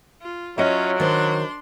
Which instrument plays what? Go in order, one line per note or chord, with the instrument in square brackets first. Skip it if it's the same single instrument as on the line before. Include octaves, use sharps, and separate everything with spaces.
[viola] F4
[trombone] F#3 [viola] C#4 F4 [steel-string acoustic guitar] D#5 E5
[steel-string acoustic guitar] D#3 C5 [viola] D4 C6